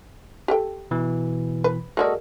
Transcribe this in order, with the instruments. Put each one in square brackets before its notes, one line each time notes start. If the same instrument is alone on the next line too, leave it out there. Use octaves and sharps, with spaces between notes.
[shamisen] G4 A4 G5
[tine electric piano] B2 E3
[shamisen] B4
[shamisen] G#3 A#3 D5 [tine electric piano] F#4 A4 D#5